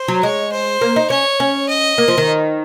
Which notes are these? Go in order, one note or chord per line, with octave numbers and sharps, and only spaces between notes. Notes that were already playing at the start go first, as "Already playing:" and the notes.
Already playing: C5
F#3
G#3 C#5
C5
A#3
D#4
C#4 C#5
C#4
D#5
A#3
F3
D#3